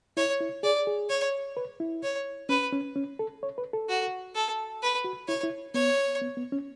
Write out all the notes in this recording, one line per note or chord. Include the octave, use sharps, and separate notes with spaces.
E4 C#5
E4
G#4 D5
G#4
C#5
B4
E4
C#5
C#4 B4
C#4
C#4
A4
C#5
B4
A4
F#4
A4
B4
F#4
E4 C#5
E4
B3 C#5
B3
B3
C#4